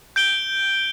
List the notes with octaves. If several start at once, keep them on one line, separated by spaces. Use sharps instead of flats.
G6 D7 G7